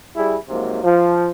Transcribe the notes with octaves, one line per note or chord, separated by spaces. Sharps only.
G3 E4 G#4
G#2 C3 F3 F#3 A#3
F3